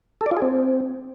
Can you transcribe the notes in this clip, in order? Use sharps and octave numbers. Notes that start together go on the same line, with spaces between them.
A4
D5
F4
G#4
C4